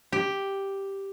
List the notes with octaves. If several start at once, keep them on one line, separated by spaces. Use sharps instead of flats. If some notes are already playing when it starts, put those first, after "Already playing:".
G4